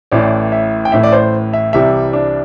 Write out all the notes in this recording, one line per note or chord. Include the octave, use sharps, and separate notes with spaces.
A1 A2 E3 D5
E5
G5
A1 A2 E3 E5
D5
C5
E5
C2 C3 E3 G3 E5
D4